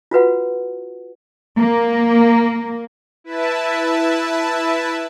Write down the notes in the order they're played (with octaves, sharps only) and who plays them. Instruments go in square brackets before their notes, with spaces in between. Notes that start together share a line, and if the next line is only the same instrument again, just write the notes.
[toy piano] F4 F#4 B4 F#5
[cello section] A#3
[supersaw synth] E4 B4 E5 A5